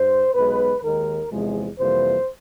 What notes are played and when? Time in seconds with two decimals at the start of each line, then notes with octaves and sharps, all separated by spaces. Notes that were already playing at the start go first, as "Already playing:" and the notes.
Already playing: G2 C5
0.34 B1 B2 G#3 B4
0.83 D#2 D#3 G#3 A#4
1.31 E2 C3 F3 G#3
1.78 F2 C3 E3 G3 A#3 C5